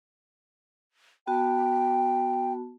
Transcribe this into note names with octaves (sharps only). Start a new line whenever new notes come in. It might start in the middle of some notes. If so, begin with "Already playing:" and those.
B3 F#4 G5 A5